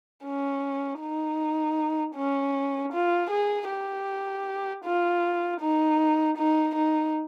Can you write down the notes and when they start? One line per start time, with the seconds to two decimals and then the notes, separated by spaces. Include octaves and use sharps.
0.24 C#4
1.00 D#4
2.16 C#4
2.93 F4
3.31 G#4
3.69 G4
4.85 F4
5.61 D#4
6.37 D#4
6.75 D#4